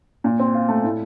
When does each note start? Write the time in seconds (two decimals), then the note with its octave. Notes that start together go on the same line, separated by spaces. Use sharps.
0.24 A#2
0.39 C4
0.54 F4
0.68 A3
0.84 A2